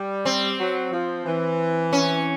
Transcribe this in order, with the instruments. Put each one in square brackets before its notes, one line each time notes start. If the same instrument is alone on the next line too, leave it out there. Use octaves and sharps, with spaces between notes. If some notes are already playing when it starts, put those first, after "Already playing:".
Already playing: [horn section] G3
[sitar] C4
[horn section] F#3
F3
E3
[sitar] C#4